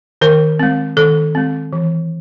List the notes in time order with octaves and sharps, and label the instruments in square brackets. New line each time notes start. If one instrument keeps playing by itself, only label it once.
[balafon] D#3 A#4
G#3 C4
D#3 A4
G#3 C4
E3